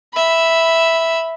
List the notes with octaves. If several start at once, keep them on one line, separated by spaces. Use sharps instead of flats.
E5 B5